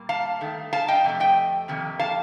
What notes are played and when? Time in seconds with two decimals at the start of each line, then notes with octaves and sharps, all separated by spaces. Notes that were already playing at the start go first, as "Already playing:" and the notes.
Already playing: A#2 G3 A#3
0.09 F5 A5
0.41 G2 D#3 A3
0.73 F5 A5
0.88 D#5 G5
1.04 F2 C3 A3
1.20 D#5 G5
1.68 F2 C3 D#3 A#3
2.00 F5 A5